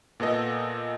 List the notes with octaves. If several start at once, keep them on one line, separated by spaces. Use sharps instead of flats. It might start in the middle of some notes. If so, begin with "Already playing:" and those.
A#2 B3 A4 D#5